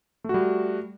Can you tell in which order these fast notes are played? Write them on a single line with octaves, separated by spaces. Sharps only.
A3 F#4 G3